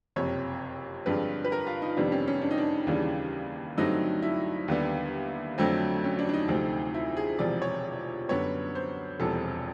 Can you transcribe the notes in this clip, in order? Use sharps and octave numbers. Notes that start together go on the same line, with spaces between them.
F#1 F2 C3 C#5
G2 D3 F3 G#3 C4 B4
B4
A#4
F4
D#4
F2 C3 D#3 G3 B3 D4
C#4
C#4
D4
D#4
D4
D#2 C#3 E3 G3 D4
G2 D3 F#3 A3 C4 D#4
E4
D#2 D3 G3 B3
F2 D3 F#3 A3 C4
C#4
D4
D4
D#4
D2 C3 F3 A3 C4
E4
G#4
E1 E2 C3 F3 D5
C#5
F#2 D3 G3 B3 C#5
C5
E1 E2 C3 F3 A4